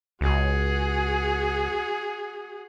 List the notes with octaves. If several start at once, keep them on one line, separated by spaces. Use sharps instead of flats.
C#2 F#4 G#4